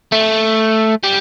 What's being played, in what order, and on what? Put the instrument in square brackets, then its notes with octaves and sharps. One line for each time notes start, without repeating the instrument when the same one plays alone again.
[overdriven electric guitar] A3
G3